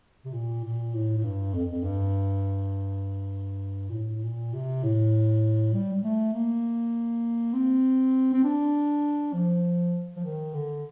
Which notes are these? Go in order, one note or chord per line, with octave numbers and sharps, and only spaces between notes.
C3
A#2
A#2
A2
A2
G2
F2
F2
G2
A#2
A2
A#2
C3
A2
G3
G3
A3
A#3
C4
C4
D4
F3
F3
D#3
D3